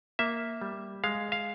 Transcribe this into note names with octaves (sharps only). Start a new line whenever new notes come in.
A#3 E5
G3
G#3 F5
F5